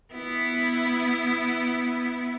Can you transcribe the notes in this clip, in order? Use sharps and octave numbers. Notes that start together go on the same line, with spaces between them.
B3 E4